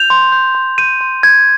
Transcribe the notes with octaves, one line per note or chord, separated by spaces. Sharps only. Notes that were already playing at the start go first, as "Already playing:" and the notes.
Already playing: G6 F7
C6
G6
C6
G6 D#7
C6
G6 G#6